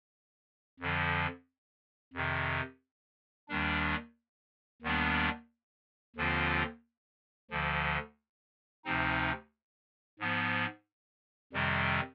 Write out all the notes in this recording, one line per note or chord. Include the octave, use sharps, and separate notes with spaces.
F2 D3 F3
F2 C3 D#3
D#2 D#3 G3 D4
D#2 D#3 G3 B3 D4
D#2 D3 F3 C4 F4
D2 D3 F3
D2 C3 F3 C4 D#4
G#2 F3 B3
F2 C3 D#3 G3 C4